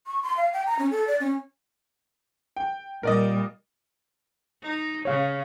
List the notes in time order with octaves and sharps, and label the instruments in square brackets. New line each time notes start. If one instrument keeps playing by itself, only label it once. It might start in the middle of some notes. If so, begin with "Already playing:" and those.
[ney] C#6
C6
F5
G5
A#5
C#4
A4
D5
C#4
[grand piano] G5
[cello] A#2 G3 [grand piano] A#4 D5 D#5
[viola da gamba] D#4
[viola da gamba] C#3 [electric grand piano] C#5 F5